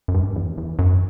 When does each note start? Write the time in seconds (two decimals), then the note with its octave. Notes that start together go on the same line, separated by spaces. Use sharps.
0.08 F#2
0.14 G2
0.36 E2
0.58 E2
0.79 F#2